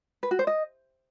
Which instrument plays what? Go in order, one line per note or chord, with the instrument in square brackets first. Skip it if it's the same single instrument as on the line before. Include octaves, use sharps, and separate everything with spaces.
[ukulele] B4
F#4
C5
D#5